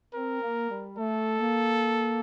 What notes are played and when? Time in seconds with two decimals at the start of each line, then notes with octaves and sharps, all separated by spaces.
0.13 C4 A#4
0.41 A#3
0.70 G3
0.97 A3 A4
1.39 A#3